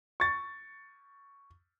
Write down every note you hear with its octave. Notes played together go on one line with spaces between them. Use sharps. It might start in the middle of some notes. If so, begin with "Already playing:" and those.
C#6 A6